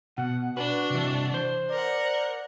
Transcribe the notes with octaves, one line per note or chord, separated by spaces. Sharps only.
B2 F#5
D4 F#4 B4
C3 E3
C5
A#4 D5 F#5